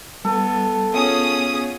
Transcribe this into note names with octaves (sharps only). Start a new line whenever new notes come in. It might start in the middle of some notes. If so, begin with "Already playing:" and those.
G3 B3 A4
B3 C#4 F4 G#4 C#5 F#5 D#6